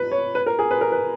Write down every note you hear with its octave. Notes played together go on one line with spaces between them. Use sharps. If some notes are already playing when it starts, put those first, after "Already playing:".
Already playing: B4
C#5
B4
A#4
G#4
B4
A#4
B4